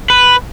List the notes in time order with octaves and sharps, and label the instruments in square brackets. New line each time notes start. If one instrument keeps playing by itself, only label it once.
[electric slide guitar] B4